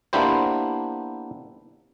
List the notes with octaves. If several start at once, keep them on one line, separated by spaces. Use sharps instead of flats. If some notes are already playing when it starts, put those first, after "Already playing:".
A#3 B3 D4 E4 G4 C5